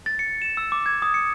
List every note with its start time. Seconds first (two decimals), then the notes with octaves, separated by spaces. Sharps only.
0.06 A6
0.19 C#7
0.42 E7
0.57 E6
0.72 D6
0.86 G#6
1.02 D#6
1.14 C#7